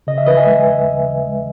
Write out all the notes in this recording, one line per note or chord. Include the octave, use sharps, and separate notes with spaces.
C#3 D#5
E5
E3 B4 D#5
E5 G#5
G#3
D#2
C#3
E3
G#3